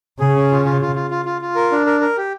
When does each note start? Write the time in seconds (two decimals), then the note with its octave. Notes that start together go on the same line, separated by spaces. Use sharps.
0.20 C#3 G#4
0.35 C#4
0.51 F4
0.65 F4
0.81 F4
0.96 F4
1.11 F4
1.25 F4
1.41 F4
1.55 A#4
1.72 D4
1.86 A#4
2.01 A#4
2.17 G4